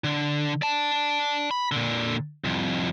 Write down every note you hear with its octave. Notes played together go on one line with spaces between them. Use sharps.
D3
D5 A5
B5
A#2 D3
C2 F2